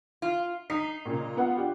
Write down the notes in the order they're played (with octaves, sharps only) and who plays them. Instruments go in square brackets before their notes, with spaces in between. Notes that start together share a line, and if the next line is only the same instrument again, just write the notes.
[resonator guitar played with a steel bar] F4
[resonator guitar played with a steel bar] D#4 [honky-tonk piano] B6 C7
[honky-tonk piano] A#2 C#3
B3 F4 F#5
D4 F4 G4